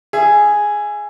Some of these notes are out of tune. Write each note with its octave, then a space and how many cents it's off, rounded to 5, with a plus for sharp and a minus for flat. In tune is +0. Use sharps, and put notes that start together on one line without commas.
G#4 +0 E5 +25